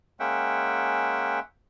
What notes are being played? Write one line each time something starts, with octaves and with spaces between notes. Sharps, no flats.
G#3 A#3 C#4 E5 F#5 G5